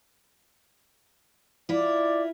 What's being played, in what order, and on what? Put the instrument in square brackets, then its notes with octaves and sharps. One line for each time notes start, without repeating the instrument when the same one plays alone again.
[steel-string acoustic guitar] E4 F4 [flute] D5